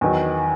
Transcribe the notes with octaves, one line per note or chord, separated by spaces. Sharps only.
E2 D#3 F#3